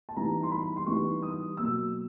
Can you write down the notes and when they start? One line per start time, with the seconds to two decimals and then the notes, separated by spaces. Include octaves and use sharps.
0.09 A5
0.17 E3 G3 B3 D#4 A#5
0.43 C6
0.51 B5
0.76 C6
0.86 E3 G3 B3 D#4 C#6
1.22 D#6
1.57 B2 F#3 A#3 E6